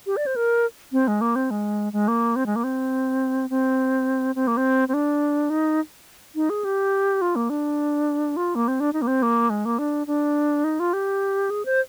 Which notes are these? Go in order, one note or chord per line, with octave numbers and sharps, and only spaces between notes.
G4
D5
C5
A#4
C4
G#3
A#3
C4
G#3
G#3
A#3
C4
G#3
A#3
C4
C4
C4
A#3
C4
C4
D4
D#4
D#4
G#4
G4
F4
A#3
D4
F4
A#3
C4
D4
D#4
A#3
C4
A#3
G#3
A#3
D4
D4
D#4
F4
G4
G#4
C5